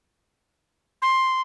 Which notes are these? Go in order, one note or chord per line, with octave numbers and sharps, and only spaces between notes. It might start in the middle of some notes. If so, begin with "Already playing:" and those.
C6